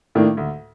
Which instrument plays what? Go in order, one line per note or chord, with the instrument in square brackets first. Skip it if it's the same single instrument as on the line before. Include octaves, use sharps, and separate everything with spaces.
[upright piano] A2 [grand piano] D#3 A#3 D4
[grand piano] D2